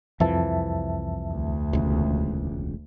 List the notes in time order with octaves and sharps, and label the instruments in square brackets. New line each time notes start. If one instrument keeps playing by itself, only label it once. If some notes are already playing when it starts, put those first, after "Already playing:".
[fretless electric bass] C2 E3 F3 [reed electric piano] F2 E5 A5
[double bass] D2
[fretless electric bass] E1 C#2